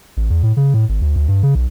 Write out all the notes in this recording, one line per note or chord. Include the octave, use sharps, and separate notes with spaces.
A1
E2
A2
C#3
A2
G#1
D2
D2
G2
C#3
B1